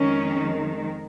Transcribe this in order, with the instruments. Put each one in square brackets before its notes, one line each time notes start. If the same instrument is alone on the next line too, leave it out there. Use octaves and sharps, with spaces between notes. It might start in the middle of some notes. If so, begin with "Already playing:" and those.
Already playing: [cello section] F2 D#3 G#3 C#4